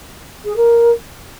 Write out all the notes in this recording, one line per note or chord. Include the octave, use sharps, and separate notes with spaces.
G#4
A#4